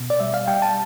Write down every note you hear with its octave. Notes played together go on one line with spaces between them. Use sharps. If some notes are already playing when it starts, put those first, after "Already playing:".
Already playing: B2
D5
G3 E5
F5
G3 G5
A5